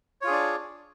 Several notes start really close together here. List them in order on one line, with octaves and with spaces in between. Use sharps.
C#5 F4 G#4 D4 D5